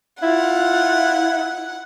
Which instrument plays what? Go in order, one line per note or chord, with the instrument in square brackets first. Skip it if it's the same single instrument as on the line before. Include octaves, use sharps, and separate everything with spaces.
[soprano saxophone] E4 [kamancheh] F4 [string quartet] F#5